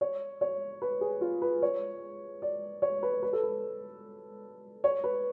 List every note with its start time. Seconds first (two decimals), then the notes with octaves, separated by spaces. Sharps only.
0.01 C#5
0.41 C#5
0.82 B4
1.01 G#4
1.21 F4
1.42 B4
1.62 C#5
2.42 D5
2.82 C#5
3.03 B4
3.23 B4
3.33 A4
3.43 B4
4.84 C#5
5.04 B4